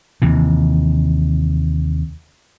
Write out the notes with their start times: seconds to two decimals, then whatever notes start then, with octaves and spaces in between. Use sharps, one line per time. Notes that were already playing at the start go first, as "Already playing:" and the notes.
0.22 D#2 C3 E3